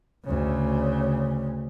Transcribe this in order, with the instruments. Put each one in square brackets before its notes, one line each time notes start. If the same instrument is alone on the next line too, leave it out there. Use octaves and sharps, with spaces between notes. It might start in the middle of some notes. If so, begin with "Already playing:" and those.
[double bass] D2 C#3